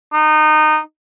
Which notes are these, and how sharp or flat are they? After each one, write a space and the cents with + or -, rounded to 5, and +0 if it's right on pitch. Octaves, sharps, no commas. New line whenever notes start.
D#4 -20